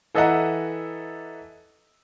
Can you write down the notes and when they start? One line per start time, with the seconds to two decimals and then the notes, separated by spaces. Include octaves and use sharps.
0.15 E3 A4 D#5 E5 F#5 A#5